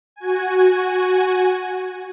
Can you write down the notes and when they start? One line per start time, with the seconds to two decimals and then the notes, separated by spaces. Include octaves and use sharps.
0.16 F#4 G#5